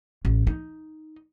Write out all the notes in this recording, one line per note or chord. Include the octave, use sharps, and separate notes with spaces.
A1
D#4